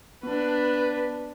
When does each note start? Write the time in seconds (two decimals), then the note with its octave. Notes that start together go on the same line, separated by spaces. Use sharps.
0.23 B3 D4 B4